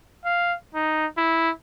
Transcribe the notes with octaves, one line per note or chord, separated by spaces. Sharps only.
F5
D#4
E4